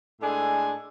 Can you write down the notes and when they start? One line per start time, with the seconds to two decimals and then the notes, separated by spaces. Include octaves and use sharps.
0.21 A2 G#3 D4 G#4 A4 G#5